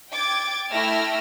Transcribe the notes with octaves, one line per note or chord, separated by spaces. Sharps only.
G5 D6 G#6 A6
A3 E4 G5 E6 F6 A#6